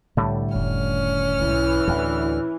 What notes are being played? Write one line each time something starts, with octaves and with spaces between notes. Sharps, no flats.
C2 A2 D3 G3
F1 D#3 C#4 F6
B1 G#2 E3
D2 A2 D#4